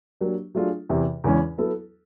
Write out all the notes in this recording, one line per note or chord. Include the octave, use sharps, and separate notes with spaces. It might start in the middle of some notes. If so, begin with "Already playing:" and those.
F#3 A#3 D4 G4 A#4
F#3 A3 D4 F4 G#4
E2 C3 E3
E2 C#3 E3 G#3 C#4
F#3 B3 E4 A4